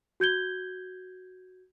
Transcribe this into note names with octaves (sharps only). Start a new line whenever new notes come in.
F#4 G6 G#6 G7